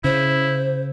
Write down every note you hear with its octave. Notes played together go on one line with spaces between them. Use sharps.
C#3 E4 C5